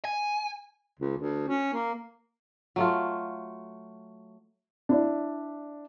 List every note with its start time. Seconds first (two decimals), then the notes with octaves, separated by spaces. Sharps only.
0.05 G#5
1.00 C#2
1.18 D2
1.48 C#4
1.73 A#3
2.76 F#3 A3 F4
4.89 D4 E4 D5